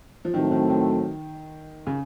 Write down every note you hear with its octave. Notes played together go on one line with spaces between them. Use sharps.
F3
A2 D#3 F#3 A3 C4
D#3
D#3
C#3